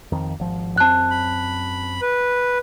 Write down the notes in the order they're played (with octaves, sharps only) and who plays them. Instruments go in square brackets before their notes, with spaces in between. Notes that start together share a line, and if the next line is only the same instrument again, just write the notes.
[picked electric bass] F2 D#3
G#1 F3
[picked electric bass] F#2 C4 [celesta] A5 F#6
[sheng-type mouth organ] B5
B4